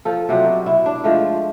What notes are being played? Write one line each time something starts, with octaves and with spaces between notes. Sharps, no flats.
F3 A4
C3 F#3 G3
B2
E4
D4
F3 G#3 A3